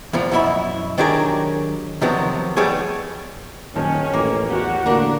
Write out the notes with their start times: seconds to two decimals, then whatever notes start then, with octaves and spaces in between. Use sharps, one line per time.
0.13 E2 A#2 F3
0.32 F#2 B2 E4 E5 B5
0.98 D#3 F#3 D4 G4 G#4 A#4
2.02 C3 D#3 F3 F#3 B3
2.57 G3 A3 B3 G#4 C#5
3.76 D#1 F#2 D#3 C#4 A5
4.13 A1 A#3
4.51 E2 F#4 G4 F#5
4.86 A2 D3 A#3 D4 A#4